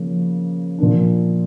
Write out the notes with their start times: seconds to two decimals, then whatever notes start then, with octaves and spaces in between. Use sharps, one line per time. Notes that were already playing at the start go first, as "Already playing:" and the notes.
Already playing: C#3 F3 A#3 C#4
0.78 A#2 F3 A#3 D4